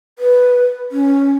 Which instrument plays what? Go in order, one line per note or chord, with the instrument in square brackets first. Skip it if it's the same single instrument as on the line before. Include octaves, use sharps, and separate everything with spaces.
[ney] B4
C#4